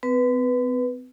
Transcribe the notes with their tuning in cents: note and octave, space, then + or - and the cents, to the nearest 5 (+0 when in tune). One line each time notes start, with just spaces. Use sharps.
C4 -45 B4 +0